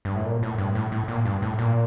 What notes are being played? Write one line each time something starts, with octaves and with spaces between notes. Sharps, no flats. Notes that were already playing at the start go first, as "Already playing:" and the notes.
G2
A2
A#2
A2
G2
A2
A2
A#2
G2
A2
A#2